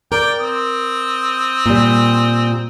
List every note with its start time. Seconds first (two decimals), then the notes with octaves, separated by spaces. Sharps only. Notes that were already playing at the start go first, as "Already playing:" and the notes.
0.12 A#4 D5 G5
0.41 C4 D#6
1.66 A#2 G3